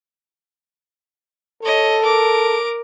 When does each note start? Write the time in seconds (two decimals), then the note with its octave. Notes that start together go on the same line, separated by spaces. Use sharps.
1.63 A4 C#5 D#5
2.01 A#4 D6